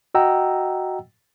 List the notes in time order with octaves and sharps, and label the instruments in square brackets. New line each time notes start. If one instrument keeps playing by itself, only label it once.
[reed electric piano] F#4 D#5 F#5 G5 A#5 E6